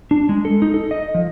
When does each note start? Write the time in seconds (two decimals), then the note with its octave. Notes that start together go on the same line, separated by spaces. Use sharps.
0.11 D4
0.29 G#3
0.45 A4
0.62 D#4
0.74 A4
0.91 D#5
1.15 F3